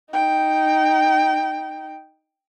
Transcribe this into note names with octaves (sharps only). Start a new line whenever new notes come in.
D#4 G5